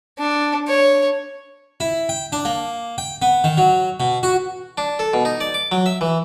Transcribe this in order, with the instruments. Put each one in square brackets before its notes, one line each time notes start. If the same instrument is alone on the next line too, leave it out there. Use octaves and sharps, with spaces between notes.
[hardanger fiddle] D4
C#5
[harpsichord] E4
G5
D4
A#3
G5
B3
D#3
F#3
B2
F#4
D4
A4
B2
D#4
D5
D6
F#3
E5
E3